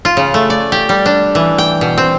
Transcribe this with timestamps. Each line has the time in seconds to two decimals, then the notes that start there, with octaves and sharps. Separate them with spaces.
0.05 F4
0.17 C#3
0.34 A3
0.50 D5
0.72 G4
0.89 G3
1.06 D4
1.35 E3
1.58 G5
1.81 B2
1.98 C4